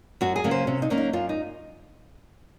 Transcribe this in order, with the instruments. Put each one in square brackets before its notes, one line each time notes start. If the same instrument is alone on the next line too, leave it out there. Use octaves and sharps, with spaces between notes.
[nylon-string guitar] F#2 F#4
G#4
C#3 F#3 A#3 C#4
C5
C3 C#4
D#4
F#3 A#3 C#4
D#4
F#2 F4
D#4